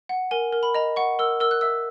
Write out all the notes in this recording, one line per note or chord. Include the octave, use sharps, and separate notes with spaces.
F#5
A#4 G#5
A#4
B5
D#5 A#5
F#5 C#6
A#4 E6
A#4 E6
F#6
E5 E6